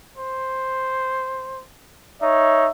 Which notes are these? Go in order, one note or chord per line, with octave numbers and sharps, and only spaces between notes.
C5
D#4 C#5 E5